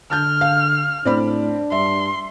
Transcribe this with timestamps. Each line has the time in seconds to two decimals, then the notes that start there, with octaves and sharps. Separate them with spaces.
0.11 D3 A5 F6 G6
0.41 F5
1.05 A2 C4 D4 D5 B5
1.72 G2 E5 C6